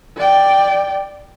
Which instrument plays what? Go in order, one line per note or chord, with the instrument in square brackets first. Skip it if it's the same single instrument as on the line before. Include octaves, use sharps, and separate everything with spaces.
[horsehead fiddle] D5 G5